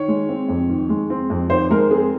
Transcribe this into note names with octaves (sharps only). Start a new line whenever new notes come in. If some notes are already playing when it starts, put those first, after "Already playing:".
Already playing: D#3 C#5
G#3
C4
F2
D#3
G#3
C4
F2
D#3 C5
G#3 A#4
C4 G#4